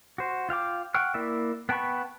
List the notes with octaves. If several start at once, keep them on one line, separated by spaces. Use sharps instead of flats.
F#4 C5
F4 F5 G5 D6
F#5 G5 C#6 F6
A#3 E4 D5 E5
B3 G5 A5 B5 C#6